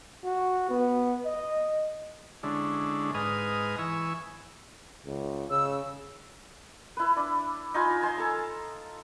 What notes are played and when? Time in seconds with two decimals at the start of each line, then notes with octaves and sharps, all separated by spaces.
0.24 F#4
0.69 B3
1.25 D#5
2.43 D3 G#3 C#4 D4 E4
3.14 G#2 B4 D#5 G#5 D#6 F6
3.78 E3 G#5 C#6 E6
5.06 C#2
5.50 C#3 E6
6.97 E4 B4
7.16 D4
7.74 D#4 F4 G#5 B5
8.02 G#5 A5 C6
8.17 A4 A5 A#5